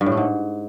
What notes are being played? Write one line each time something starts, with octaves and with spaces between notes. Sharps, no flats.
G2
A2
A3
G#2